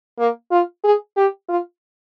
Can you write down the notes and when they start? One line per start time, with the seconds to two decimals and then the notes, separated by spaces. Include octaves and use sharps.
0.19 A#3
0.51 F4
0.84 G#4
1.17 G4
1.49 F4